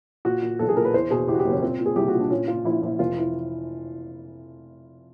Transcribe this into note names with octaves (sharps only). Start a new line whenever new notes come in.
A#2 F#4
A#2
B1 A4
G#4
A#2 A#4
B4
E2 C5
B2 G#4
E2 G4
F#4
F#1 G4
C#4
A#2 C4
A#2
G#4
C2 G4
F#4
A#2
D4
A#2 C#4
A#2 F4
A#1 E4
A#1
F1 F4
E3